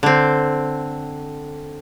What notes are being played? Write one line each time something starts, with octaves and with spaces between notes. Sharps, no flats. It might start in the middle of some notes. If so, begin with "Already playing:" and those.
D3 C4